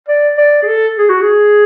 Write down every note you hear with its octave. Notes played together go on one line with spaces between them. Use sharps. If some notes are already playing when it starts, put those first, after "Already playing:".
D5
D5
G#4
A4
G#4
F#4
G#4